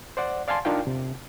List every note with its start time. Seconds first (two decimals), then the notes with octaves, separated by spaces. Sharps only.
0.17 C5 D5 F#5
0.48 D5 F5 G#5 A5 C6
0.65 D4 D#4 F4 A#4 F5 G5
0.87 C3